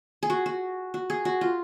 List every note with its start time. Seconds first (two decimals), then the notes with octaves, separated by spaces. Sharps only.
0.23 G#4
0.30 F#4
0.46 F#4
0.94 F#4
1.10 G#4
1.25 F#4
1.41 F4